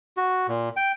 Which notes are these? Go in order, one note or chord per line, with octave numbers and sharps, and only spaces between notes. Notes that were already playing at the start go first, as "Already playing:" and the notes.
F#4
A#2
G5